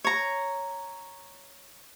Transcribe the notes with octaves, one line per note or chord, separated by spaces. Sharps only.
C#5 A#5